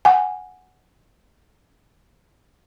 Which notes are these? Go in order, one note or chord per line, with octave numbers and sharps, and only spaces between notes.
F#5 G#5